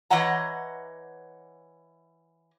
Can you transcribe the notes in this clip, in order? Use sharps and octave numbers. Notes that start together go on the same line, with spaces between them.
E3 C#5 D#5 F#5 A#5